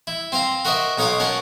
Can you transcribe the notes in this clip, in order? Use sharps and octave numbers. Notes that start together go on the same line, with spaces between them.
E4
C4 C5 F5 A#5
F#4 A#4 C5 D#5 E5
B1 D#4 C#5 F5 C6 D6
C#4 A#4 F#5 A5